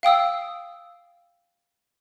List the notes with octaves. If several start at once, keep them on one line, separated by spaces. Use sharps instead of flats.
F5 G5 D#6 E6